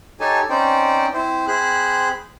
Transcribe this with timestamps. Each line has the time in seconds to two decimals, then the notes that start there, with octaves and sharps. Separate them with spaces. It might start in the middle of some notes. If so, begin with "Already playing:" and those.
0.20 D#4 G4 A4 C#5 G#5 A5
0.50 C4 C#4 D#4 C5 D5 G5
1.14 C4 E4 C5
1.48 C4 G#4 C5 B5 F#6